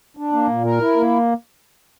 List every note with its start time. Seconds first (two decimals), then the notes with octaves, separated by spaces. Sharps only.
0.17 D4
0.32 A#3
0.49 A#2
0.64 A#4
0.80 E4
0.96 A#3